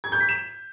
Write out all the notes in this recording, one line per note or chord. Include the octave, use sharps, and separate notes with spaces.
G#6
G6
B6
E7